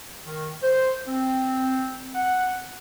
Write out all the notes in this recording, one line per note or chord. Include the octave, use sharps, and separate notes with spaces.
D#3
C5
C4
F#5